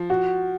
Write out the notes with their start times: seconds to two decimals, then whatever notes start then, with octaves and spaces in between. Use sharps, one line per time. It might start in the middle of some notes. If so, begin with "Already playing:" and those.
Already playing: F3
0.10 F#4